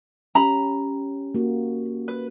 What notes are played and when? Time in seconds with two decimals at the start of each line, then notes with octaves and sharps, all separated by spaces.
0.35 C#4 G4 A#5 B5
1.35 A#3 F#4
2.08 B4